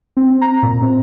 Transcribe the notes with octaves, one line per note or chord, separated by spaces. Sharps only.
C4
A#5
A#2
C4